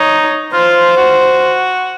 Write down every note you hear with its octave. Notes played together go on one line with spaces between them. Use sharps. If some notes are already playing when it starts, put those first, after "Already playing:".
Already playing: D#4 C#5
F4 C5
F#4